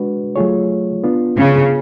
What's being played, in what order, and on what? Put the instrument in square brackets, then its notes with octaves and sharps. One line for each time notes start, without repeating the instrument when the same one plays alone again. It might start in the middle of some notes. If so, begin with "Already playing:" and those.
Already playing: [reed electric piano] G#3 D4 F#4 B4
F#3 A3 F4 G#4 C#5
B3 D4 F4
[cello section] C#3